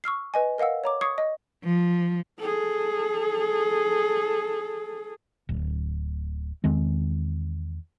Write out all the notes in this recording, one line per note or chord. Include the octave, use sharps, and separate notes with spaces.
C#6 E6 F6 C7
B4 D#5 G#5
A#4 D#5 F5 F#5 E6
C#5 A#5 D6
C#6 D#6 G#6 C7 C#7
D#5
F3
G#4 A4
D1
E2 D#3 G#3 C4